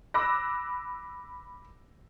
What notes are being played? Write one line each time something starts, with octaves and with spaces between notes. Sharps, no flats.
B5 D6 E6 F#6 A#6